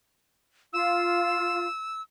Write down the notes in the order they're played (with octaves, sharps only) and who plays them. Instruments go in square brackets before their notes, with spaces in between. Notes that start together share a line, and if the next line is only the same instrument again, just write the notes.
[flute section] F4 F5 [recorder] E6